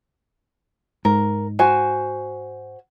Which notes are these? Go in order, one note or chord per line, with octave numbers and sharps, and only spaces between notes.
G#2 A#4
F#4 C5 G#5